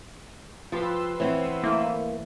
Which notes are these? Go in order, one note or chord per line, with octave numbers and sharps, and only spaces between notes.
F3 F4 G4 B4 C6 E6
E3 B3 C4 C#5
E3 A3 A#3